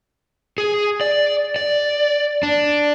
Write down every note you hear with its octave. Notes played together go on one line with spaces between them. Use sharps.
G#4
D5
D5
D4